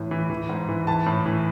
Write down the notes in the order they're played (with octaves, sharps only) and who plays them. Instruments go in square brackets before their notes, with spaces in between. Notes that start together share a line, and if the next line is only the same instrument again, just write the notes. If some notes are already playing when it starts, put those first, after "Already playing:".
Already playing: [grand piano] A2 E3
E3
E3
G#2
E3
E3 A5
A2
E3